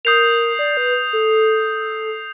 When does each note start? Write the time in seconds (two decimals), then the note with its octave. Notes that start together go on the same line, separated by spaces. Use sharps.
0.05 A#4 D#6 G6 C7 F7
0.59 D5
0.77 B4
1.13 A4